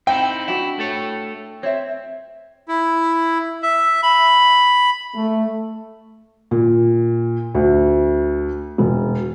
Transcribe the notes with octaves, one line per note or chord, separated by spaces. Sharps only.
C4 D#4 E4 G5
D4 E4 F#4 F#5
A3 A4 C#5
C4 C#5 E5
E4
E5
B5
A3
A#2
D2
E1